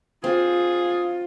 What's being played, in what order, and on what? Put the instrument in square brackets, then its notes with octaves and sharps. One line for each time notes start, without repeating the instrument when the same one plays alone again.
[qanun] C4 [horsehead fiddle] F4 [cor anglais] G#4